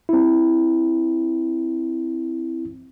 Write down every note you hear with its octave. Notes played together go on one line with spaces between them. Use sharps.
C4 E4